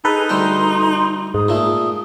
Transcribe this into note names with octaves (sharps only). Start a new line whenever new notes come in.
D#4 G#4 A4 B4
D2 G3 G5 C6
G#2 D#6
A#2 A3